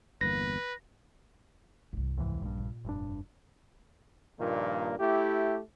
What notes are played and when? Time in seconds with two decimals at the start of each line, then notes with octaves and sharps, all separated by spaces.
0.21 G1 E2 A#3 B4 A#6
1.93 C2 G2
2.18 D#2 G#2 E3
2.42 A#1 G2 G#3 A#3
2.58 A#2
2.85 F1 G2 D4
4.39 G2 A#2 D#3 F3 A#3
4.99 A3 E4 G4